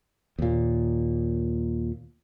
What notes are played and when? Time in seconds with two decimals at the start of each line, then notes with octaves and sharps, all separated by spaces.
0.39 D#2 A#2